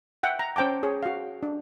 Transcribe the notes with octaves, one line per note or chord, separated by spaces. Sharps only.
E5 F#5 G5
A#5
C#4 C5 G5 A5 D6
G#4 C#5
F#4 F5
D4